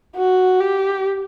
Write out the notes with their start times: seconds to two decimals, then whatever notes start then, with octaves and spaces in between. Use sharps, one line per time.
0.16 F#4
0.60 G4